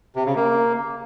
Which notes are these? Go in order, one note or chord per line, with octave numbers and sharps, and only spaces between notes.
C3
C#3
A#3